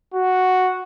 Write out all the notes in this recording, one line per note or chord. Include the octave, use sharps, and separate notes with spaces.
F#4